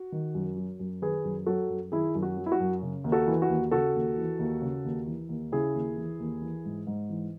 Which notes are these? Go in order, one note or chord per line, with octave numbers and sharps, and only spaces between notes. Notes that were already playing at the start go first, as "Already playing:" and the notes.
Already playing: F#4
D#3
F#2
F#3
F#2
D#3 G#4 B4
F#2
F#3 F#4 A4
F#2
D#3 E4 G#4
F#2
F#4
F#3
E4
F#4
F#2
C#3
D#2
F#4 A4
E3
F#4
D#2
C#3 F#4 A4
D#2
E3
D#2
C#3
D#2
E3
D#2
C#3 E4 G#4
D#2
E3
D#2
E3
G#2
G#2
E3